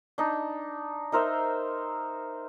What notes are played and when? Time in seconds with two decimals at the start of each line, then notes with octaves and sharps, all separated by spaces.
0.18 D4 D#4
1.12 D#4 A#4 C5 E5